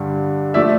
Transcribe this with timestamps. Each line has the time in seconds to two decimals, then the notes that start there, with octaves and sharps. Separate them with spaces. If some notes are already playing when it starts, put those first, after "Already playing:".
Already playing: G2 D3 G3
0.54 F3 A3 D5 E5